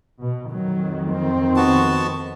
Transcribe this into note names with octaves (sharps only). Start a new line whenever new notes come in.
B2
F2 D#3 F#3
C4
B3 F#4 A5